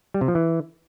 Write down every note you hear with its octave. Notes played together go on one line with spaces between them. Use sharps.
G3
C3
F3
E3